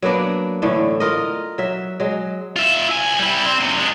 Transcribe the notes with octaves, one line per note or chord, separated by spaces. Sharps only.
F#3 A#3 B3 D4
A2 D3 E3 A3
F4 A#4 D#5
F#3 E5
F#3 G#3
F4 E5
C2 G#5
G3 E4
C4
F#2 C3
G#3 D4